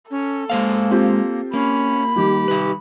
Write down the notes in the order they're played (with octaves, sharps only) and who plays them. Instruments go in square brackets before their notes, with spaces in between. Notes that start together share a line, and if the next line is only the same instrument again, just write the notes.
[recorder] C#4 [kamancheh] A4
[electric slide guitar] G#3 C5 F5 [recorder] A#3
[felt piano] C4 F4 G4
[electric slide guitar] A#3 [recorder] C#4 [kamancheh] B5
[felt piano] D#3 G3 [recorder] G4
[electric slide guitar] D#4 B4